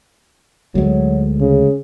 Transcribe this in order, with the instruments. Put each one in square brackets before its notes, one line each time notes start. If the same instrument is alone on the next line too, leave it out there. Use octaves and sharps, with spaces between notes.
[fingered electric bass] D2 G#3 [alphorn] F#3
[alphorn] C#3